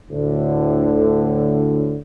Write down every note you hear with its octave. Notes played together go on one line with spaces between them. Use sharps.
D2 A2 D3